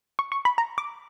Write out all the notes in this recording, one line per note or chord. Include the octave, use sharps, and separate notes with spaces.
C#6
C#6
B5
A#5
D6